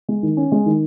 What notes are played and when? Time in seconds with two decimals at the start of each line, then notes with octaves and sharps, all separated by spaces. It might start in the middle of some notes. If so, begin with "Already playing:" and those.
0.09 G#3
0.23 D#3
0.37 C#4
0.52 G#3
0.66 D#3